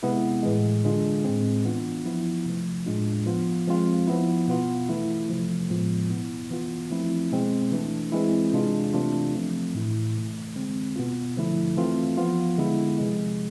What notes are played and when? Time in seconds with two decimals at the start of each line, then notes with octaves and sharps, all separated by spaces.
0.03 C3 G#3 B3 E4
0.43 A2 E3 G#3
0.84 D3 G#3 D4 F4
1.24 A2 G#3 C4
1.65 E3 B3 D4 F4
2.05 F3 B3 E4
2.46 C3 F3 A3
2.86 A2 G#3 D4 F4
3.26 F3 B3 F4
3.67 F3 G#3 C4 F4
4.07 F3 B3 E4
4.48 B2 B3 F4
4.89 E3 A3 E4
5.29 C3 F3 A3
5.69 A2 F3 G#3 B3 F4
6.10 B2 B3 E4
6.51 E3 B3 F4
6.91 F3 A3 C4 E4
7.32 B2 G#3 C4
7.72 E3 A3 D4
8.12 E3 G#3 C4 E4
8.53 C3 G#3 D4 F4
8.93 C3 E3 A3 D4 F4
9.34 F3 A3 C4
9.75 A2 E3 A3 E4
10.15 C3 E3 A3
10.56 D3 G#3 C4
10.96 B2 B3 F4
11.36 D3 F3 A3 E4
11.77 E3 A3 C4 F4
12.17 F3 B3 F4
12.58 D3 G#3 B3 E4
12.99 C3 F3 G#3